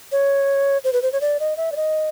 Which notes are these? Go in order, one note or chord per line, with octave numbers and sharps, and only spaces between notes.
C#5
C5
B4
C5
C#5
D5
D#5
E5
D5
D#5